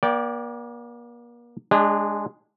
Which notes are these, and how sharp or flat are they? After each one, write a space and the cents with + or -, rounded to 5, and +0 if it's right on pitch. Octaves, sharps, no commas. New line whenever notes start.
A#3 +40 D5 -15 G5 +0
G#3 +0 D4 +0 G#4 -40